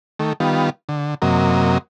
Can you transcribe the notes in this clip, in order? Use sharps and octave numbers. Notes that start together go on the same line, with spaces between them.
D#3 A3
D#3 G3 B3 F4
D3
F#2 C3 F#3 A#3 D#5